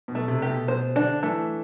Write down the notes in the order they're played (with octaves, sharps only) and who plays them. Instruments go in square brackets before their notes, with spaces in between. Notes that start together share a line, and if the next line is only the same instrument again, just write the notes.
[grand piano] B2
[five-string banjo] A3
[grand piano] C3
[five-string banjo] G4
[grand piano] B2
[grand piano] B2 [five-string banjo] C5
[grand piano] D3 [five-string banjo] D4
[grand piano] E3 [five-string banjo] A3